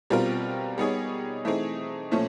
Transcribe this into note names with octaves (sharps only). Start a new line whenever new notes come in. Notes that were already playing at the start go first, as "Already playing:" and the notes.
B2 G3 C4 F4 A#4
G3 B3 D#4 G#4 C#5
E3 A3 C4 D#4 G#4
A#2 F3 A3 C#4